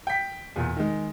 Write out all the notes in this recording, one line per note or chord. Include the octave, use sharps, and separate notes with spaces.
G5 B6
E2 A#2
D#3 G#3